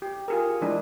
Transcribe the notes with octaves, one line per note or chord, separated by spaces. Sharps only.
G4
F4 G#4 A#4
E3 G#3 D4